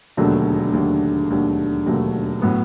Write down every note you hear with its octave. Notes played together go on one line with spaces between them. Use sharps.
E1 D#2 D3 F#3 A3
E1 D#2 D3 F#3 A3
E1 D#2 D3 F#3 A3
E1 D#2 D3 F#3 A3
A2 F#3 B3